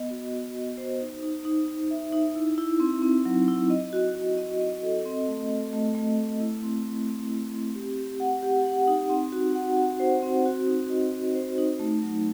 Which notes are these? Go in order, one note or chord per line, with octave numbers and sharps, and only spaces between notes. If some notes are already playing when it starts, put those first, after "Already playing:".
Already playing: B3 D#5
F#4
F#4
D#5
C5
D#4
D#4
D#4
D#4
E5
D#4
E4
E4
C4
C4
F#3
E4
D#5
F#4
F#4
D#5
D#5
A4
C4
A3
C4
A3
A3
A3
E4
C4
C4
C4
E4
C4
G4
G4
F#5
G4
F#5
D#4
C4
F#4
F#5
F#4
C5
C4
F#4
D#4
D#5
F#4
C5
D#4
A3
F#3